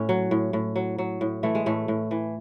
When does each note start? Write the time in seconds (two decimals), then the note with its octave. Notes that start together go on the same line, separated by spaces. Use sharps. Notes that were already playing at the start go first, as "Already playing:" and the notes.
Already playing: A2 C#4
0.09 F#3
0.31 A2
0.53 A2
0.76 F#3
0.98 F#3
1.21 A2
1.43 E3 A3
1.55 G#3
1.66 A2 A3
1.88 A2
2.11 E3